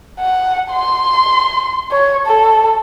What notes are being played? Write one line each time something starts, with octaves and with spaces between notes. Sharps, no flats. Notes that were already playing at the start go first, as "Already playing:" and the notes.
F#5
C6
C#5
A4